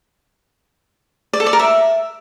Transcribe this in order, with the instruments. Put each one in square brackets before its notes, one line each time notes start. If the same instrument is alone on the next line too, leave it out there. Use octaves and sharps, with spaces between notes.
[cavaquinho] D5
A4
D5
A#4
E5